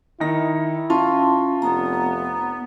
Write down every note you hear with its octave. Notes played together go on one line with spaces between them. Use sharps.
D#3 D#4 E4 A#6
C#4 F4 A5 C6
F1 B3 A#5